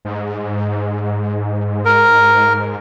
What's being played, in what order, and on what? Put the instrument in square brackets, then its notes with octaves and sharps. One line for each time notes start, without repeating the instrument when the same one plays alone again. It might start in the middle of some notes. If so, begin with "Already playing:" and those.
[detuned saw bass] G#2
[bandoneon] A#4